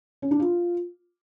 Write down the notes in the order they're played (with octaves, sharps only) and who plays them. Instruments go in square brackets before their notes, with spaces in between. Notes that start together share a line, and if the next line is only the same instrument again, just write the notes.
[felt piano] C#4
D4
F4